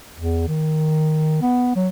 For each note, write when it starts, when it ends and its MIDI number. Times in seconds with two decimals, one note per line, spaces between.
0.16 0.47 40
0.48 1.41 51
1.41 1.72 59
1.76 1.88 54